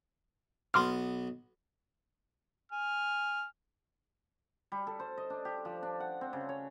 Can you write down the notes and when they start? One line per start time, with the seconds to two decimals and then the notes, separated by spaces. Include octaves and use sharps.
0.74 B1 B3 C6 D6 F6
2.72 G#5 F6
4.72 G3
4.87 A4
4.99 C5
5.18 D#5
5.30 D4
5.45 G4
5.65 F3
5.83 D4
6.00 F#5
6.21 C4
6.33 C#3
6.49 C#5